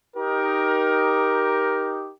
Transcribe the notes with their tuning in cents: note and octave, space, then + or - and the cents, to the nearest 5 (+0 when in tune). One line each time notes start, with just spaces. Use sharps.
D#4 +0 G4 +0 A#4 +15